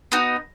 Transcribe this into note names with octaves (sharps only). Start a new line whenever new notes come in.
B3 D#4 F#4